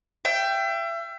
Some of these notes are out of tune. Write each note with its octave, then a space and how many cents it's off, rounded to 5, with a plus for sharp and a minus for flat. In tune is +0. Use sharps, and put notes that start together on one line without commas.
E5 +35 G5 +0